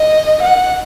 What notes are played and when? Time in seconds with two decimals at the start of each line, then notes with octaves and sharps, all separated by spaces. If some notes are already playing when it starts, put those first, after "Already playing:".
Already playing: D#5
0.43 F#5